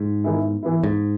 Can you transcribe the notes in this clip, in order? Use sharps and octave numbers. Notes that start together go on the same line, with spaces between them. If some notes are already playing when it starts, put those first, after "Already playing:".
Already playing: G#2
D#3 G#3 B3 E4 G#4
E3 B3 E4
G#2